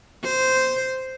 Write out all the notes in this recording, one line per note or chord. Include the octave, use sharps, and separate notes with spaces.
C5